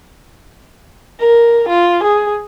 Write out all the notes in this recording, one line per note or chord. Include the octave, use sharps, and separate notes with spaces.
A#4
F4
G#4